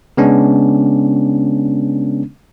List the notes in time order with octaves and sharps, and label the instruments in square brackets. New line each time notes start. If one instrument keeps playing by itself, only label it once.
[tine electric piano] C#3 G#3 B3 C#4 D4